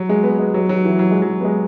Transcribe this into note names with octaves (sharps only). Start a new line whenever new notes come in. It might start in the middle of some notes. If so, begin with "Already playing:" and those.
Already playing: F#3
G#3
B3
G#3
F#3
F#3
E3
F#3
G#3
F#3
B3
G#3